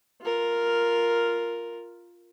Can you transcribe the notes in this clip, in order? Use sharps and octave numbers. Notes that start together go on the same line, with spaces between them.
F4 A#4